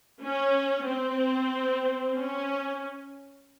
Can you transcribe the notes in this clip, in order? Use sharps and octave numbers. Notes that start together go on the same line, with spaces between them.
C#4
C4
C#4